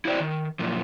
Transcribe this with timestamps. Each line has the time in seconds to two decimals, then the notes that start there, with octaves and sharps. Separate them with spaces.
0.05 E4 F#4 G4 C5 D5
0.20 D#3
0.59 F#2 A#2 F3